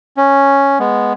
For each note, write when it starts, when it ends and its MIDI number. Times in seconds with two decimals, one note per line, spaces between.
0.17 0.78 61
0.79 1.13 56
0.79 1.13 59